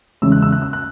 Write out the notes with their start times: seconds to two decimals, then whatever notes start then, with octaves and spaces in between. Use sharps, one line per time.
0.22 E2 C#3 G#3 C#4 E4 E6
0.32 F#6
0.42 E6
0.52 F#6
0.62 E6
0.73 F#6